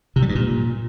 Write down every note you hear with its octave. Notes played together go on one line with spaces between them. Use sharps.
C3
G3
G2
A#2